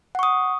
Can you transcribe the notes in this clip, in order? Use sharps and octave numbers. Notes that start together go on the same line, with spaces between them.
F#5 C#6 D#6